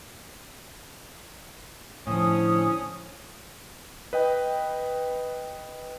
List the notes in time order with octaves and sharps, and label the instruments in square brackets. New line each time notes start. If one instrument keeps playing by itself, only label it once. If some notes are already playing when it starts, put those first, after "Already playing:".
[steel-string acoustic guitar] A2 D3 [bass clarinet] F3 [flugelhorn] C#4 [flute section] D#6
[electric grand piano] B4 D#5 G5